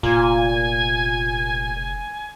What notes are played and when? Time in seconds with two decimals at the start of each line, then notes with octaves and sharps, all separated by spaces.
0.03 F1 A#2 G#5